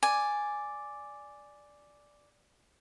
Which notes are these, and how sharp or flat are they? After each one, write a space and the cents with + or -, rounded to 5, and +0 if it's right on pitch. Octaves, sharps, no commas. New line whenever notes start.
D5 +0 G#5 +0